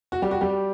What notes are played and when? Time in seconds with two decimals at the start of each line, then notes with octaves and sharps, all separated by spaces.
0.12 F#4
0.22 G3 G4
0.31 F#4
0.41 G3 G4